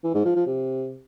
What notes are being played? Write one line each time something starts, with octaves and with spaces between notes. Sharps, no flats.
E3
G#2
F3
F3
C3